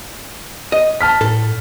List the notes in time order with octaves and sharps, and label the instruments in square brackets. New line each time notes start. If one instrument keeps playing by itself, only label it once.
[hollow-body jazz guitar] D#5
[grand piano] A5 F6 B6
[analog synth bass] A2 [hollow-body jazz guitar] A4